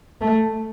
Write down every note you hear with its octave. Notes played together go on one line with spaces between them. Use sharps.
A3